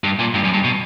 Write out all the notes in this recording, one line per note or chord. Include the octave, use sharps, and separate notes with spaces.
G2
A#2
G2
F#2
G2
B2